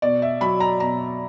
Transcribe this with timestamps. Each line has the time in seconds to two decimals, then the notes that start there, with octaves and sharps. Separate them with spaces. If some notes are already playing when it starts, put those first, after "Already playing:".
0.02 B2 D5
0.22 E5
0.41 F#3 B5
0.60 A#5
0.80 B2 A#5